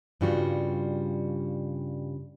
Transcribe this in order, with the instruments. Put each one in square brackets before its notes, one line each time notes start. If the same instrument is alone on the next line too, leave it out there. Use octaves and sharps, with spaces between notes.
[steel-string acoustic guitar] G2 C#3 G3 F4 F#4